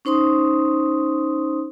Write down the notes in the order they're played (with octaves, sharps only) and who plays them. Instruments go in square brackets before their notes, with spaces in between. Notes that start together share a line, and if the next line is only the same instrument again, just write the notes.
[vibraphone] C#4 D#4 C5 C6 D#6